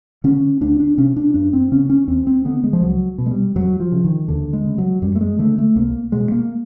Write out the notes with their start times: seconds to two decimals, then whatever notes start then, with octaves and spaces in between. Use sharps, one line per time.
0.24 D3 C#4
0.61 D2 D4
0.80 D4
0.98 C3 C#4
1.16 D4
1.34 F#2 D4
1.53 C4
1.72 C#3 C#4
1.90 C#4
2.07 D#2 C4
2.27 C4
2.45 D3 B3
2.64 G#3
2.73 F3
2.82 C#2 F#3
3.18 B2
3.26 G#3
3.31 G3
3.55 F2 F#3
3.80 F3
3.92 C#3
4.04 D#3
4.28 D#2 D3
4.53 G#3
4.65 C#3
4.78 F#3
5.02 F#2 G3
5.15 A3
5.21 G#3
5.39 D3 A3
5.58 A3
5.76 C2 A#3
6.12 B2 G#3
6.32 A#3